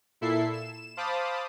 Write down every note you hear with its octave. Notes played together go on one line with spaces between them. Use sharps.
A#2 E4 A4 E5 C7
E7
C5 F5 A5 B5 D6 D#6